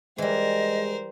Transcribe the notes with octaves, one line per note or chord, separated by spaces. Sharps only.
E3 G3 G#3 A#4 C5 D#5